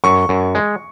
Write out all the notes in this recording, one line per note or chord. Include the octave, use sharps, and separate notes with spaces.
F#2 C#6
F#2
G#3